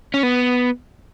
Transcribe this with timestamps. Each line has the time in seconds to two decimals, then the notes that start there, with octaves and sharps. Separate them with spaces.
0.14 C#4
0.23 B3